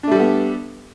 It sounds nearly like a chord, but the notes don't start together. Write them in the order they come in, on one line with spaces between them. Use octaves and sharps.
D4 A3 G3 A4 B3